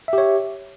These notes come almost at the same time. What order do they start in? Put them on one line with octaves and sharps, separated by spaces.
E5 G4 C#5